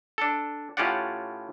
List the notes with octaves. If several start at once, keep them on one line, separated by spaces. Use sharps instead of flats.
D4 A4
A2 C#4 F4 G4 D5 F#5